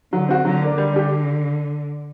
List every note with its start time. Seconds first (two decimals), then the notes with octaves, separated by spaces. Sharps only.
0.12 D3 F#3
0.28 C4 F#4
0.45 D3 F#3
0.61 A#3 D4
0.77 D3 G3
0.93 D4 G4